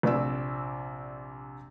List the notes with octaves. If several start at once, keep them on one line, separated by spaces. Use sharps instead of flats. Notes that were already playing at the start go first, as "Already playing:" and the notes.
A#1 C3 D5 E6